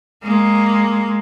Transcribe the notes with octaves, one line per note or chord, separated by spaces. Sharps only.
G#3 A#3